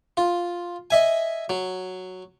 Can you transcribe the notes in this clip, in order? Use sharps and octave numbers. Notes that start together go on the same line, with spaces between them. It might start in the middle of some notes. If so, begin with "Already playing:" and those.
F4
D#5 E5 G#5
F#3